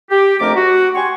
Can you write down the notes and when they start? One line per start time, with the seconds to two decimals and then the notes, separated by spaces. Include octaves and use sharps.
0.10 G4
0.40 F2 A3 D4 A#4 D6
0.55 F#4
0.95 G4 F#5 G#5 C6 C#6